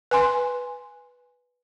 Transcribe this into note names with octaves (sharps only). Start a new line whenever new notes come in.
B4 G#5 C6